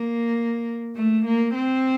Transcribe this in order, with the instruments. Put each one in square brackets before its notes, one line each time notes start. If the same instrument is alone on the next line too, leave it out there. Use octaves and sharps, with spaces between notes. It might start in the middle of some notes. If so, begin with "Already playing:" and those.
Already playing: [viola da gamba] A#3
A3
A#3
C4